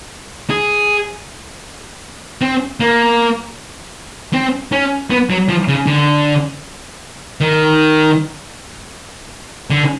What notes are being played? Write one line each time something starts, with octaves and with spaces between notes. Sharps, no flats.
G#4
C4
A#3
C4
C#4
B3
F#3
F3
C#3
D3
D#3
D3